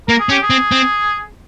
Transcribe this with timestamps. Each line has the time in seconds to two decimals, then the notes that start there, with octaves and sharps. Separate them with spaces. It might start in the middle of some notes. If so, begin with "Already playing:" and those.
0.08 A#3 A#4
0.19 G#4
0.29 C#4 G4
0.42 G#4
0.50 C4
0.72 C4